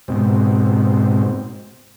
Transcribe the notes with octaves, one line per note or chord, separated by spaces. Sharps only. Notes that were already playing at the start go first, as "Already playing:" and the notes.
G#2 B2 C4